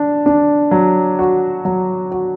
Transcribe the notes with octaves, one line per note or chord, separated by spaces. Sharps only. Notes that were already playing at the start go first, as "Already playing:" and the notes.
Already playing: D4
D4
F#3
F#4
F#3
F#4